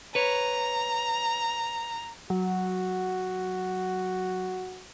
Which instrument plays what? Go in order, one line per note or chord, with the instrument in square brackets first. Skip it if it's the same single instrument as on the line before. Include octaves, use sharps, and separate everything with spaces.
[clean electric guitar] B4 C#5 [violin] A#5
[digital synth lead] F#3 [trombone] F#4